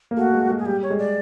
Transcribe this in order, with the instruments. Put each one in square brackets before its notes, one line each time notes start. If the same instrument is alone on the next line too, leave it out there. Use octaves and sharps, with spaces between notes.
[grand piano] A#3
[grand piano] A3 [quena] F#4
[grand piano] G#3
G#3
[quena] G#4
[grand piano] G3 [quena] G4
[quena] C#5
[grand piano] G#3
[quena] D5